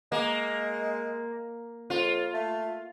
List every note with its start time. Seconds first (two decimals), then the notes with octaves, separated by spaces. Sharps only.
0.12 G#3 A#3
1.90 F2 F4
2.34 A3